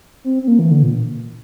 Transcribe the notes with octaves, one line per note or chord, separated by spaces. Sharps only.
C4
C4
A#3
E3
D3
A#2